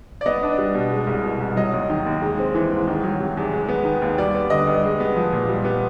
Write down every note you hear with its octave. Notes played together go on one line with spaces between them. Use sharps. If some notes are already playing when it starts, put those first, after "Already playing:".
D5
B3 D#5
D4
G3
B2
G#3
C2
B2
C2
F#3 D#5
D#2
D#3
D#2
G#3
C4
E3
G#2
D#3
F#3
C3
E2
G#3
B3
D#3
D#2
G3 D5
B3
D3 D#5
G2
G#3
B3
F3
A#2
G3
B3